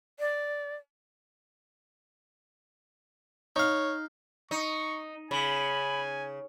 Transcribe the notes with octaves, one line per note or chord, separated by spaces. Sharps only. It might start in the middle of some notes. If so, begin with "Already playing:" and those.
D5
D#4 C#5 F5
D#4 C#6
C#3 G#5 B5